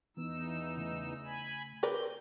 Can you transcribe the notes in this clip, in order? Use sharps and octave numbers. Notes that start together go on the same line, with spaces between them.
E2 E3 B3 D#4 E6
C#3 A3
G#5 B5
C4 A#4 B4 D5 G6